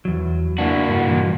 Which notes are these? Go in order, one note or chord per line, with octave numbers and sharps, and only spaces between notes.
E2 F#3
A#3 D4 E4 F#4
G2 G#4 F#5
G2 A#2 E3